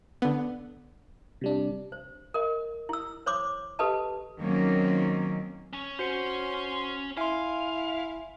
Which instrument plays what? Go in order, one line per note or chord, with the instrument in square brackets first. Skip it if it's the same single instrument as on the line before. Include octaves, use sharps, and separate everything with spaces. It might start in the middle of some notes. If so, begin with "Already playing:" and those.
[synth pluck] D3 B3
[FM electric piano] C3 G3 D4
[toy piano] C5
A#4 D#5
E4 E6
C5 C#5 C6 D6
G4 A4 B4 D#5 A5
[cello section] D#3 F#3 A#3 C4 C#4
[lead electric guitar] C#4 C#5
[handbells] F#4 C5 C#7 [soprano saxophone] C6
[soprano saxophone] E4 [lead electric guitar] F5 [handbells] G#5 C6